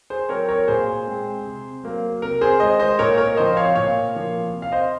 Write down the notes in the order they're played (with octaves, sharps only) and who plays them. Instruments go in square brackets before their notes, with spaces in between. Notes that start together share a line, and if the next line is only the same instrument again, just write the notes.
[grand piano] G#4 C5
F#3 C4 A#4 C#5
A#4 C#5
A#2 G#4 C5
G#3 C4
C3
F#3 A#3
C3 A#4
G#4 C5
D#3 G#3 C5 D#5
C5 D#5
A#2 A#4 C#5
A#4 C#5
F3 C4 C5 D#5
C#5 F5
A#2 C#5 F5
F3 A#3
C3
F5
C5 D#5